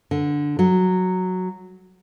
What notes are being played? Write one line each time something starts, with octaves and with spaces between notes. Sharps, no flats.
D3
F#3